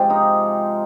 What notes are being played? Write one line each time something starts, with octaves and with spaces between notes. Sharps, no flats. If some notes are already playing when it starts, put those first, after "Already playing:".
Already playing: C3 F3 G#3 C4 F4 G4
D#4